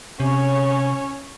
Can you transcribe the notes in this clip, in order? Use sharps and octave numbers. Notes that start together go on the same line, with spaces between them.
C3 C#4 C#5